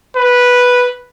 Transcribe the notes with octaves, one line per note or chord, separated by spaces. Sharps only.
B4